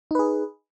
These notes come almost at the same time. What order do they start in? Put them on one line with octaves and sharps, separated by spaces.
D#4 B4 G#4